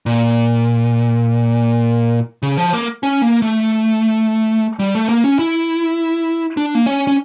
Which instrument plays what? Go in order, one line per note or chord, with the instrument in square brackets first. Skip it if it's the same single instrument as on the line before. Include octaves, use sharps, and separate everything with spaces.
[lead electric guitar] A#2
C#3
F3
A#3
C#4
A#3
A3
G3
A3
A#3
C#4
E4
D4
A#3
C#4
C#4